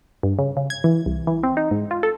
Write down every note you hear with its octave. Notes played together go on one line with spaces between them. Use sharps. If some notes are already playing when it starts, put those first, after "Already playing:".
G2
C#3
C#3
G#6
E3
C2
E3
C4
D#4
G#2
F4
A4